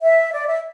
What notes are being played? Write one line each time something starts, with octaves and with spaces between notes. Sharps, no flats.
E5
D5
E5